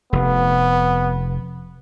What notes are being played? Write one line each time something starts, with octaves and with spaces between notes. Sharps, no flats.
F1 B3